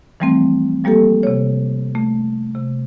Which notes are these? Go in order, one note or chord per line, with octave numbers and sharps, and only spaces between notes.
E3 F3 G3 A3 C4
F3 G3 A#3 G4 A4
C3 C#5
A3
C3